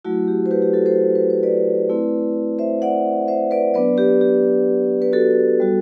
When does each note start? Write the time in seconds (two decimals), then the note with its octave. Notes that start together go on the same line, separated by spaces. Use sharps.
0.05 F#3 A3 E4 F#4
0.28 G4
0.46 C5
0.51 G4 B4
0.62 G4
0.73 F#4 A4
0.86 A4 C5
1.15 B4
1.30 C5
1.43 B4 D5
1.90 A3 C4 E4
2.59 C5 E5
2.82 D5 F#5
3.28 C5 E5
3.51 B4 D5
3.74 F#3 B3 D4 B4 D5
3.97 G4 B4
4.21 G4
5.02 B4
5.13 F#4 A4
5.60 G3 B3 F#4